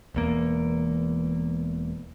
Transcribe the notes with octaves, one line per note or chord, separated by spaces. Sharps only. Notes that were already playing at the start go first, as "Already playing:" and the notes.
E1 E2 A#3